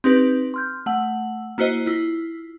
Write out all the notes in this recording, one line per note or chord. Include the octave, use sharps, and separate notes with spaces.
C4 D#4 G4 B4
C6 F6 G6
A3 F#5 E6
A#3 E4 F#4 C5 D#5
E4 F4